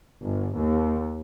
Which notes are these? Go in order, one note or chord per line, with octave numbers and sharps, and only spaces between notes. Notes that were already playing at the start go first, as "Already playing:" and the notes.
G1
D#2